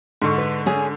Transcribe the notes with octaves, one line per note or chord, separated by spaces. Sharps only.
G#2 D3 C#6
B4
C#4 G#4